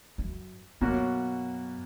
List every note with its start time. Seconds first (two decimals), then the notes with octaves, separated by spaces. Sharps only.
0.18 F#2
0.81 F#2 B2 A#3 C#4 F#4